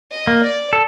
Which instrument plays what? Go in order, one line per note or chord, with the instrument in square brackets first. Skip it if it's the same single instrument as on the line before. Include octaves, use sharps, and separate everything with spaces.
[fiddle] D#5
[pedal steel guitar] A#3
[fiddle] D5
[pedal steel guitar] A4